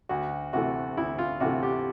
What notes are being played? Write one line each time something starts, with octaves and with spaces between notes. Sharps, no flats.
D2 F#4
C3 E3 A3 F#4
D2 E4
F4
C3 E3 A3 F#4
G4